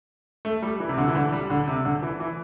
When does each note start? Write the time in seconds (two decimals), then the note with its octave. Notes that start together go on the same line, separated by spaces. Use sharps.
0.45 A3
0.62 G3
0.80 E3
0.89 C3
0.98 D3
1.08 E3
1.15 D3
1.32 G3
1.50 D3
1.68 C3
1.85 D3
2.03 E3
2.20 E3